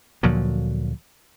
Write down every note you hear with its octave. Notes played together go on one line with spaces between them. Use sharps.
D2 A#2 F3 F#3